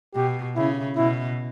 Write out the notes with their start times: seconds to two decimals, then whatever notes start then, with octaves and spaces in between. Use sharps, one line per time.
0.15 B2 G4
0.56 C#3 E4
0.96 B2 E4